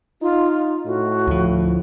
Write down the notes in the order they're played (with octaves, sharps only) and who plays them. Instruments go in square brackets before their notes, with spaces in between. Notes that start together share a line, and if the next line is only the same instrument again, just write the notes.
[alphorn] D#4 [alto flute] F4
[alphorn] A2 [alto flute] F#4
[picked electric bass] D2 F3